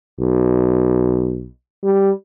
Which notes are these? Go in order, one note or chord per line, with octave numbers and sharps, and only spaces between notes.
B1
G3